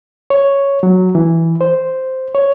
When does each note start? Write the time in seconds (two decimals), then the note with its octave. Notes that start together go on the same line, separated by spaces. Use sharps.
0.30 C#5
0.83 F#3
1.15 E3
1.61 C5
2.35 C#5